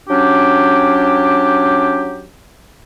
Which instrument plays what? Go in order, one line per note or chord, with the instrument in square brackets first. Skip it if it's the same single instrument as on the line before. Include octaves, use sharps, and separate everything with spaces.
[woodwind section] F#3 C#4 D4 G4